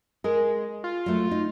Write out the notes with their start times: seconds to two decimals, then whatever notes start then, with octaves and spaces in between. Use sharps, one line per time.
0.24 G#3 A#4
0.84 F4
1.06 F#3 A3
1.31 D#4